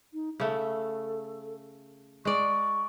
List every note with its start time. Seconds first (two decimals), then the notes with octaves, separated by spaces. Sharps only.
0.13 D#4
0.40 C#3 A3 A4
2.25 G#3 D5 C#6